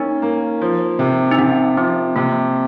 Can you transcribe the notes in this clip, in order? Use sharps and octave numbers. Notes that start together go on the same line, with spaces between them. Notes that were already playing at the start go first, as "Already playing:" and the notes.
Already playing: A#3 C#4 D#4
A#3
F3
C3
D#4
C3 C#4
F3 C4
C3 A#3